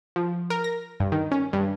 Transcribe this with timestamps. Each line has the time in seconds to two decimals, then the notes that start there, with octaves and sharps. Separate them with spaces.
0.16 F3
0.50 A#4
0.64 A#6
1.00 G2
1.12 D#3
1.32 C#4
1.53 G2